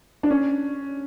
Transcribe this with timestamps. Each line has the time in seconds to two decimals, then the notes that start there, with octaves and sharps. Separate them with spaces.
0.23 D4
0.30 C#4